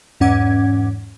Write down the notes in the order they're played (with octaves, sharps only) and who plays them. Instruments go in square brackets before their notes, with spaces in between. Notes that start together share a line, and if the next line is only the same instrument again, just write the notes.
[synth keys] E2 G#2 C#4 F#5 D6 G#6